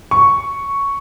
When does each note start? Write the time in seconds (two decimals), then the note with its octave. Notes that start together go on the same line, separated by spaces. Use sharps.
0.11 C#6